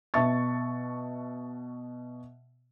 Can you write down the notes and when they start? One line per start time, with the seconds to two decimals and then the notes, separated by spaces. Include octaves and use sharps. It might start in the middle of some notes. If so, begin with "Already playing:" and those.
0.14 B2 E5 A5 C#6 A6